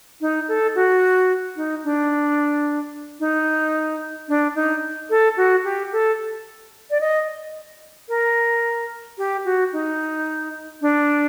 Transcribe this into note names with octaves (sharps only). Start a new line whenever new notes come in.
D#4
A4
F#4
D#4
D4
D#4
D4
D#4
A4
F#4
G4
A4
D5
D#5
A#4
G4
F#4
D#4
D4